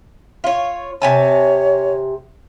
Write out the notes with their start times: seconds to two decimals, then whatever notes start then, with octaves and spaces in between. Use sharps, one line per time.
0.44 F4 C#5
1.02 C3 C#5 G#5 A5